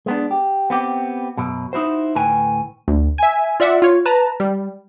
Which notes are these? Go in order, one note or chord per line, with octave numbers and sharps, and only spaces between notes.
G#3 B3 D4
G4
B3 C4 G4
B1 F#2 B2
D#4 E4 F#4 C5
D2 A2 B4 G5 G#5
D2
E5 G#5
F4 D5 E5 F#5
F4 C#5
B4 A5 A#5
G3